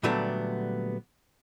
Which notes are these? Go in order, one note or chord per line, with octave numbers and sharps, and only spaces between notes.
A#2 D3 F#3 G3 A3 B3